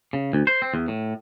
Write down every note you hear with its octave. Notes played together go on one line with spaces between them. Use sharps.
C#3
D2
C5
C4
E2
A2